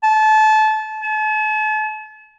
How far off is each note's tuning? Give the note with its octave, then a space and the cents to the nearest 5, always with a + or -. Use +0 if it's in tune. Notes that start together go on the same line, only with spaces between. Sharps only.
A5 -25
A5 -40